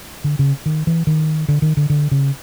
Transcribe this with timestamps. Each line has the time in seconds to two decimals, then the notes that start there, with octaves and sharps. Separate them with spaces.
0.24 D3
0.39 C#3
0.66 D#3
0.87 E3
1.07 D#3
1.48 D3
1.62 D#3
1.77 D3
1.90 D3
2.11 C#3